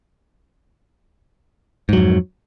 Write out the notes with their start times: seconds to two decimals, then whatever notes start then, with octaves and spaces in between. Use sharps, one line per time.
1.89 G#2
1.93 F#3
1.97 F2